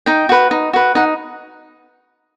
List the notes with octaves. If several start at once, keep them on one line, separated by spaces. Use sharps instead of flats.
D#4 G5
F#4 B4
D#4
F#4 B4
D#4 F#5